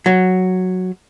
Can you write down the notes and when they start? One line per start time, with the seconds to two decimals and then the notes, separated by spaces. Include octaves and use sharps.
0.06 F#3